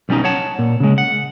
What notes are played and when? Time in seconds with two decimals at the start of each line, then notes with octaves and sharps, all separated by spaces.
0.09 B1 G3 C#4 D#4
0.24 C#5 F#5 A5
0.59 A#2
0.80 C#3 G#3
0.98 F#5